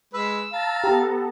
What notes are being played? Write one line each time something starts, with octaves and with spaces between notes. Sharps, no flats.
G#3 B4 E6
F5 A5 A#5 A6
B3 G4 A4 A#5